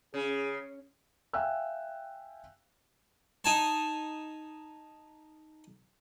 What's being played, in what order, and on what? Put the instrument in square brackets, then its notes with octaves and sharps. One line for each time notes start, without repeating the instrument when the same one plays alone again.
[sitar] C#3 [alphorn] G#4
[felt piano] E5 F5 G5 G#5 E6 F#6
[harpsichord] D#4 G#5 A5